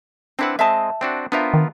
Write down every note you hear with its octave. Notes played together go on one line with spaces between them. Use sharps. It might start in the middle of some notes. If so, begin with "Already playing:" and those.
C4 D4 E4 B4 F#5
G#3 C4 D#5 E5 A5
C4 D4 F#4
B3 D4 F4 A#4 C5 E5
D#3